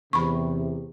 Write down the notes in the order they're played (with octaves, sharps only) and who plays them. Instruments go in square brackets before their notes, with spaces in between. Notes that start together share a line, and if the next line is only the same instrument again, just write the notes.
[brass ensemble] E2 C3 [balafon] B5 C#6